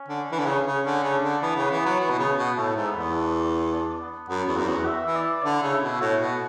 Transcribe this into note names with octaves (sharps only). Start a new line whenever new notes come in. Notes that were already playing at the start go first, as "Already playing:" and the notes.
Already playing: C#4
D3
E3
D3
C#3
C#3
D3 C#4
C#3
D4
D3
E3 B3
C#3
E3
F#3
E3
B2
C#3
B2
A2 A3
G#2
B3
E2
D4
D4
B3
F#2 B3
E2
F#2 F#4
E2
E5
E3
D5
D3 E4
C#3
E4
B2
A2 F#4
B2